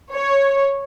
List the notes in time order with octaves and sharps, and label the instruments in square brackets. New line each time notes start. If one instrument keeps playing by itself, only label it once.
[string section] C#5